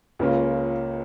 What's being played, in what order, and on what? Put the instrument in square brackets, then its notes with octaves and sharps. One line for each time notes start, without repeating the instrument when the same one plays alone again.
[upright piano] C#2 C#3 A#3 C#4 F4